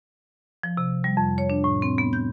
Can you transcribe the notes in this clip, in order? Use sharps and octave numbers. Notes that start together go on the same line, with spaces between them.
F3
C3
G3
F2
C#5
D4
A2
C4
B3
G6